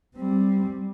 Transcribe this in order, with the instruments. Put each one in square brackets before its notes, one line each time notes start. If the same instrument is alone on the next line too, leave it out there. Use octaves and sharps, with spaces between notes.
[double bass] G3 C4